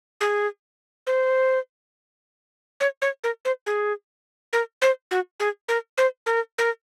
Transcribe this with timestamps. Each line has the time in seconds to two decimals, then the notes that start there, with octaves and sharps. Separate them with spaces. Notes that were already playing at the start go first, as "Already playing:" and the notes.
0.21 G#4
1.07 C5
2.80 C#5
3.02 C#5
3.24 A#4
3.45 C5
3.66 G#4
4.53 A#4
4.82 C5
5.11 F#4
5.40 G#4
5.68 A#4
5.98 C5
6.26 A#4
6.58 A#4